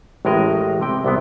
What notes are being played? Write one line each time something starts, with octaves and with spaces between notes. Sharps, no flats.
A1 A2 G#3 A#4 D#5
C3 G5
C2 C3 B3